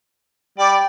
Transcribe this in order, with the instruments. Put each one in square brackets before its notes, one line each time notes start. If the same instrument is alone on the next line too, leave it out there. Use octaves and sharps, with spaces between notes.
[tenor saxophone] G3 [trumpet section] D5 [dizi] G5